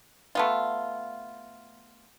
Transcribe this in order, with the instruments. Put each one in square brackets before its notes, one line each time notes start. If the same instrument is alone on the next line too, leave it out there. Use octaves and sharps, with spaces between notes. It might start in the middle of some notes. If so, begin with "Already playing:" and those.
[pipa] A3 B3 F4